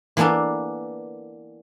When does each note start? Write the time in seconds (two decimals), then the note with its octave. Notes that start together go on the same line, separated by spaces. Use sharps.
0.17 E3 A#3 B3 D4 A4